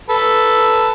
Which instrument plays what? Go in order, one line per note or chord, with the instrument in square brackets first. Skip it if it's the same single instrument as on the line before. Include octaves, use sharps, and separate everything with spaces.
[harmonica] A4 B4